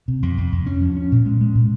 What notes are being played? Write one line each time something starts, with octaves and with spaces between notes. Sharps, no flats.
C3
F2
F2
F2
C#4
F3
C#4
A#2
G#3
G#3
A#2